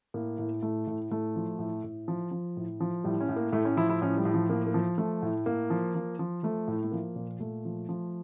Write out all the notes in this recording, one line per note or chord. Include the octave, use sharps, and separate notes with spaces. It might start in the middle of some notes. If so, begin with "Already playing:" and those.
A2 A#3
A2
A2 A3
A2
A2 A3
F3
A2
A2
F3
F3
A2
F3
A2 G3
C#4
A2
A#3
A2 A3
C#4
F3 E4
E4
A2 C#4
G3
A2
F3
F3 A#3
A#3
F3
F3 A3
A2
A2 A#3
F3
F3
F3
F3 A3
A2
A3
F3 A#3
A#2
A#2 A3
F3
F3